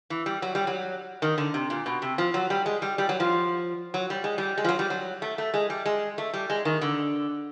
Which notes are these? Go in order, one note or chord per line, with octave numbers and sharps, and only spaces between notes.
E3
G3
F#3
G3
F#3
D#3
D3
C3
A#2
B2
C3
F3
F#3
G3
G#3
G3
G3
F#3
F3
F#3
G3
G#3
G3
G#3
F3
F#3
G3
F#3
A3
A3
G#3
G3
G#3
A3
G3
G#3
D#3
D3